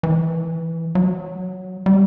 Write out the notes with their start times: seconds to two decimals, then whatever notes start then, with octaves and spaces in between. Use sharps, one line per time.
0.03 E3
0.95 F#3
1.86 G3